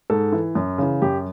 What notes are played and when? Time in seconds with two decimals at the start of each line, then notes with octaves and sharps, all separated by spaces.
0.10 G#2 A4
0.32 E3
0.55 F#2
0.78 C#3 E3
1.02 F#2 G4